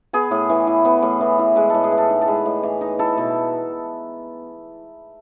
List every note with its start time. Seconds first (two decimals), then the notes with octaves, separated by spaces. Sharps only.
0.13 B3 G#4
0.31 A2
0.49 E3
0.67 E4
0.85 B3
1.02 A2
1.21 E3
1.39 E4
1.56 G#3 B4
1.70 A2 A4
1.84 G#4
1.92 E3
1.98 A4
2.10 D#4
2.22 A4
2.28 G#3 B4
2.46 A2
2.63 E3
2.81 D#4
2.99 E4 A4
3.18 B2